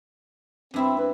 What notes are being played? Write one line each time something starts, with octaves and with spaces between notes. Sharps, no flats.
G2 C4 E4 E5
B4